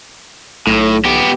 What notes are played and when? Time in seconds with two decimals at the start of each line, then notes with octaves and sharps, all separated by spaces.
0.67 B1 A2
1.05 B3 G4